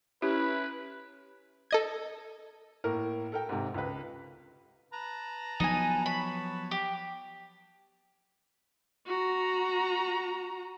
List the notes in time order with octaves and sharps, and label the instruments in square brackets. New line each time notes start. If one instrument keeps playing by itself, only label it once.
[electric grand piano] C#4 E4 [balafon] G4 [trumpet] B4
[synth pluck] A4 D#5 G#6
[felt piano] A2 A#3 A#4
A4 A#4 G5
G#2 C3
C#2 B4
[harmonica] B4 A5 A#5
[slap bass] F3 F#3 B3 [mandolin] D#4 G#5
[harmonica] B4 C#5 A5 [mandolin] B5
[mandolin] G4
[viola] F#4 A#5